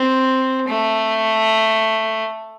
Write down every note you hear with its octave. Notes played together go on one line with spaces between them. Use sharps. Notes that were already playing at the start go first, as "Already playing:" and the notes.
Already playing: C4
A3